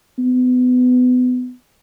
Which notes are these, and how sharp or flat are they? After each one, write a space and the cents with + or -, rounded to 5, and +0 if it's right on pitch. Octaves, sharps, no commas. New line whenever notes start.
B3 +25